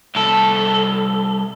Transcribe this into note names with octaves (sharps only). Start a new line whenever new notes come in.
C2 A4